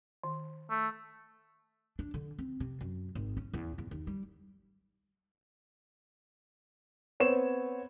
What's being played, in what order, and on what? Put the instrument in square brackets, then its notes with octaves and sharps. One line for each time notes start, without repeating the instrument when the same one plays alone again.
[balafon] D#3
[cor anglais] A3
[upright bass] D4
D3
C4
C3
F#2
G#1
C#4
E2
E2
D#2
G3
[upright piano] B3 C4 C#5 E7